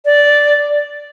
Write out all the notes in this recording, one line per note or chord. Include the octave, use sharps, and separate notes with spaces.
D5